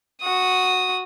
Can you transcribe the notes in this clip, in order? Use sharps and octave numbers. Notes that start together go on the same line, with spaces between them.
F#4 D#6